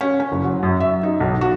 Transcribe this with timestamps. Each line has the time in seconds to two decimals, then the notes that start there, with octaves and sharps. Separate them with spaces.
0.01 C#4
0.20 C#4
0.32 F#1
0.44 F#3
0.63 F#2
0.80 E5
1.03 D#4
1.20 B1
1.41 F#4